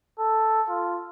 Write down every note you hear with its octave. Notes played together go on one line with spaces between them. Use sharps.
A4
F4